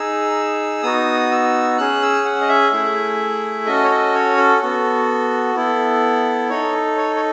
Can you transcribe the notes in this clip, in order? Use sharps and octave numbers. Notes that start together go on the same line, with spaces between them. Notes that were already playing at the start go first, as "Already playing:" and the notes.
Already playing: D#4 G#4 E6
B3 D#4 F#4 D#6
E6
C#4 G#4 F#6
E6
F#5
D#5
E5
A3 E4 G#4
C#4 F#4 A4 D#5
C#5
D#5
C#5
A4
B3 F#4 A4
B3 E4 A4
D#4 A4 C#5
C#5
C#5